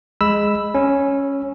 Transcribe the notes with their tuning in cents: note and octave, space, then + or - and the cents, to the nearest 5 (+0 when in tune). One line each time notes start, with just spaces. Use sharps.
G#3 +0 B5 +0 E6 +0
C#4 +0 C#5 -30